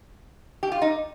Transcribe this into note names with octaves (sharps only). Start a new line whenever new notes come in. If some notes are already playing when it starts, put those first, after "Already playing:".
G4
F4
D#4